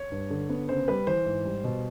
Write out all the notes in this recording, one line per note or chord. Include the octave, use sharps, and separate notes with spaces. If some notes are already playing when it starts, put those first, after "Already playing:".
Already playing: C#5
G2
D3
B3
C#3 C5
G3 B4
E3 C5
G#2
G3
B2